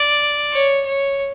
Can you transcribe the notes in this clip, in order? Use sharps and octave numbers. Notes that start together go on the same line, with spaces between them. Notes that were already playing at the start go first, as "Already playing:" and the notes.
Already playing: D5
C#5
C#5